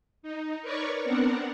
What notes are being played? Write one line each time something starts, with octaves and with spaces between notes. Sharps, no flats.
D#4
A#4 B4 C#5 D5 C#6
B3 C4 D4 A#4 F#5